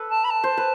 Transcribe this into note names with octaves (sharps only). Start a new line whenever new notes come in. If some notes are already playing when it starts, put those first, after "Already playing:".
Already playing: A4 B4
A5
B5
A5
C5
B4